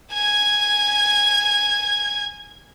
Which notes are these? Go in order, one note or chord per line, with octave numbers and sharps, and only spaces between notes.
G#5 G#6